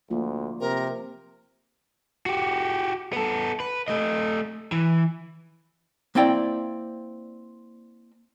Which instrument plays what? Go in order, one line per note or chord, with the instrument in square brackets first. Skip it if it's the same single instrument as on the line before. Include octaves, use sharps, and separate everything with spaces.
[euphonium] D2 [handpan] F3 A#3 F4
[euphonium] C3 [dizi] A#4
[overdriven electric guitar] F#4 G4
B3 A4
B4
A3 D#5
E3
[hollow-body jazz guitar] A#3 C4 E4 D5 G5